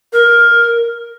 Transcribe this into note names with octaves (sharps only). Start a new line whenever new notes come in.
A#4